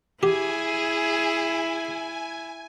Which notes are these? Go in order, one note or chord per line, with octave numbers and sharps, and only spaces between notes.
E4 G4 G#4 G#5